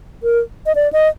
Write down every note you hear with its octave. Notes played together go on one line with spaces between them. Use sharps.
A#4
D#5
D5
D#5